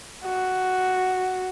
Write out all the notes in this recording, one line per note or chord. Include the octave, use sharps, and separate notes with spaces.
F#4